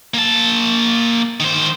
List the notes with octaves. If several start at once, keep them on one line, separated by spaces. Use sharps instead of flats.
A#3 A5
D#3 C5